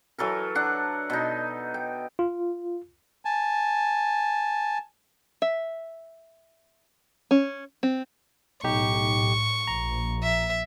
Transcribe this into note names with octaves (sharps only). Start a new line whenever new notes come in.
E3 F#3 A4 A#4
D4 F#5
B2 D#4
G5
F4
G#5 A5
E5
C#4
C4
B1 A2 D#4 G4 C#6
A#1 A#5
E5